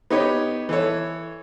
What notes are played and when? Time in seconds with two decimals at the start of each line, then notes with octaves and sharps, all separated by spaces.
0.10 B3 D#4 G4 C#5
0.69 E3 A4 C#5